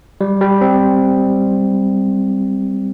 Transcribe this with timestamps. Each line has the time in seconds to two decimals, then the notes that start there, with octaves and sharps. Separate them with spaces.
0.21 G3
0.41 G3
0.61 C4